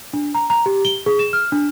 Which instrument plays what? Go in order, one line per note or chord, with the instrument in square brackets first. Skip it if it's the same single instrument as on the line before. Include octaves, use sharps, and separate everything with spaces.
[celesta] D4
A#5
A#5
G4
G7
G#4
E7
F6
D4